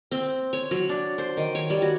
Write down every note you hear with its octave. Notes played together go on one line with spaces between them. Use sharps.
C4
C#5
F#3
D4
C5
D#3
C#5
G3
F#4